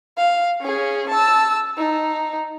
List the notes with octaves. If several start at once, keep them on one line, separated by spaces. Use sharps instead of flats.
F5
C#4 G#4
A5 E6
D#4